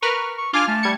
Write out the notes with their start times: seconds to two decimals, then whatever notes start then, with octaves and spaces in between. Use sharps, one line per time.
0.02 A#4 B4 C#6 F6
0.38 C#6
0.53 D4 F4 G#5 D6 F6
0.68 A3 A5
0.83 G3 G#6 C#7